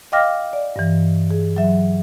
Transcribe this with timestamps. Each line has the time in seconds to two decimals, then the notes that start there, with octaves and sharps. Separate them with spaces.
0.12 D#5 F5 G5 D6 F6 A#6
0.53 D5
0.76 G2 E3
1.31 G#4
1.56 F#3 E5